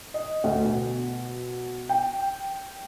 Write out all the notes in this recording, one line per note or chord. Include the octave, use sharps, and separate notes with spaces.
D#5
D2
B2
G5